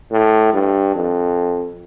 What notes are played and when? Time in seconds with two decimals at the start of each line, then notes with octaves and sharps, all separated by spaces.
0.11 A2
0.54 G2
0.95 F2